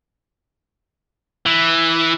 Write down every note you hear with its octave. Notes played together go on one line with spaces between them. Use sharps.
E3